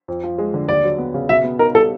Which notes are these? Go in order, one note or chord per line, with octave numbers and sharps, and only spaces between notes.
F2
F3
G#3
D3
D#2 D5
F#3
B3
C#3
B2 E5
B3
D#4 A#4
G3 A4